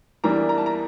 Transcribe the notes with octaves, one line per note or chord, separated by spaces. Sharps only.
E2 E3 G3 A#3 D4 A#5
A#5
A5
A#5